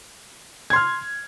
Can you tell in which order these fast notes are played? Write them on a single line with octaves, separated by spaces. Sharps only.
G#6 C6 F6